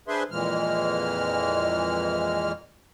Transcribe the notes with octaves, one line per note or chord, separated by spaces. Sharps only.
D4 G#4 B4 C5 E5 C6
F2 A#2 E3 G#3 F6